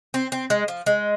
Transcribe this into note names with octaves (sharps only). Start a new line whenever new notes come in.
C4
C4
G#3
F3
G#3